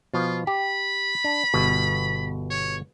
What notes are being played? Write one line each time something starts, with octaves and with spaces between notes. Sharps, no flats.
B2 F3 F4
G4 B5
D4
G1 B2
C#5